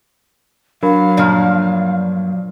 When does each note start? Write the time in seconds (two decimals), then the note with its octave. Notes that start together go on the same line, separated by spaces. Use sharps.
0.83 F#3 D4 A#4 F5 B5
1.17 G2 A#2 F3 D5 F6